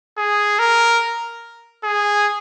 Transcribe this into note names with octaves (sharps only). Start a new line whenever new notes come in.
G#4
A#4
G#4